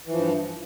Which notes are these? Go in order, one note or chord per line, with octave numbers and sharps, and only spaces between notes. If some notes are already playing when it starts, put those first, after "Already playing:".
G2 E3 F3